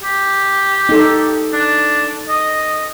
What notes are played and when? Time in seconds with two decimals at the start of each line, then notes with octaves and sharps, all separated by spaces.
0.03 G4
0.89 D#4 A4
1.53 D4
2.29 D#5